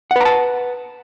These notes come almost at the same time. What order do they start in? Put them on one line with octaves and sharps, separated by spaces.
F#5 B4 A#5 A5